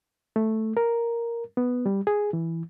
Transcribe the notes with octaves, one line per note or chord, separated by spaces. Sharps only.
A3
A#4
B3
G3
G#4
E3